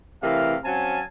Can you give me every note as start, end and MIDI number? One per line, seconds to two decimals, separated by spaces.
0.22 0.56 48
0.22 0.56 52
0.22 0.56 57
0.22 0.56 70
0.22 0.56 77
0.64 1.00 54
0.64 1.00 60
0.64 1.00 61
0.64 1.00 77
0.64 1.00 80
0.64 1.00 81